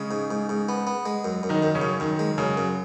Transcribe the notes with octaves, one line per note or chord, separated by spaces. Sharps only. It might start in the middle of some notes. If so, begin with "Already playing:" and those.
Already playing: C#3 G#3 C#4
G#2
G#2
G#2
B3
B3
G#3
F#2
F#2
D#3 D#4
F#2
C#3 C#4
F#2
F#2 D#3
G#3
F#2 C#3
F#2